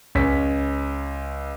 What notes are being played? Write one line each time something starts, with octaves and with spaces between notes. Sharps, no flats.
C#2 C#4 B6